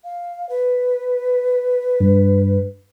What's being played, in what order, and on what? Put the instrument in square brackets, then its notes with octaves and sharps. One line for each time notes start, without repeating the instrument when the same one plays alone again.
[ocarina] F5
B4
[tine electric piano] G2